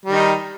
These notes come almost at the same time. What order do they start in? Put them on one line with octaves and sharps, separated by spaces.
G3 D#3 D#4